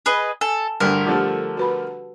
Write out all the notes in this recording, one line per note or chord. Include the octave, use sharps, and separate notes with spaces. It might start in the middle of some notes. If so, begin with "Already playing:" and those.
G#4 B4 D#5
A4 G#5
D2 G2 D3 G3 A#4
D3 F3 A3 F4 G4 A4
F#4 B4 B5